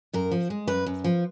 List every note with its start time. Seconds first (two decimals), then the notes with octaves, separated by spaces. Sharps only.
0.13 F#2 A#4
0.31 F3
0.50 G#3
0.68 F#2 B4
0.86 F#2
1.04 F3